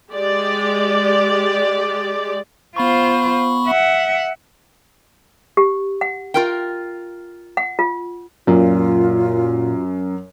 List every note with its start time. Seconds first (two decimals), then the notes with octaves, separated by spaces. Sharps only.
0.13 G#3 G4 D5
2.76 B3 F4 C5 B5 C#6
3.66 E5 F#5
5.57 G4
6.01 F#5
6.34 F4 A#4 G5
7.57 F#5
7.79 F4
8.47 F#2 A#2 F4